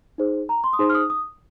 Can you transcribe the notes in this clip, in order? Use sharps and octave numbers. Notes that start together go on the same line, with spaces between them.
D#4 G#4 C5
A#5
C6
D#6
D#4 G#4 C5 C6
F6
D#6
D#6